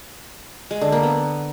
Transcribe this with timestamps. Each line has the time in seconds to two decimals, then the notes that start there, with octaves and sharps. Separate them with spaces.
0.71 G#3
0.81 D3
0.92 A#3
1.03 B3